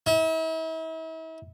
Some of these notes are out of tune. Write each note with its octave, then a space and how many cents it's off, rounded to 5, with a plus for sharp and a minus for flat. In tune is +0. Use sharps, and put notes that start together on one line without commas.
E4 -40